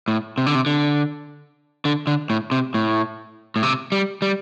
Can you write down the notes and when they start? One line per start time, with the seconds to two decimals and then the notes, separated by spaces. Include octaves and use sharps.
0.08 A2
0.38 C3
0.46 D3
0.55 C3
0.66 D3
1.85 D3
2.07 D3
2.30 A2
2.51 C3
2.74 A2
3.56 A2
3.63 C3
3.92 G3
4.22 G3